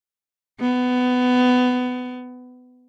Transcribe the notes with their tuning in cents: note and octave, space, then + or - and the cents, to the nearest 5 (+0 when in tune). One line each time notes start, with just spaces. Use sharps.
B3 +20